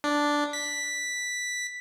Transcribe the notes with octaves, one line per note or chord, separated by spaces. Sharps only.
D4
B6